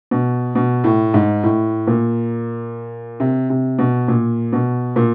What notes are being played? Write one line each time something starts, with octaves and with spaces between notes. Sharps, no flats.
B2
B2
A2
G#2
A2
A#2
C3
C3
B2
A#2
B2
A#2